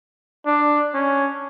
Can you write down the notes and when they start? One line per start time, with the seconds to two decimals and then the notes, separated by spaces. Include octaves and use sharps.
0.46 D4
0.94 C#4